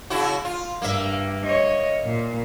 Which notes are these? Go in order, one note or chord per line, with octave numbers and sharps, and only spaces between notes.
C#3 E4 F#4
F4
G2 A#3 E5
C#5 D#5
A#2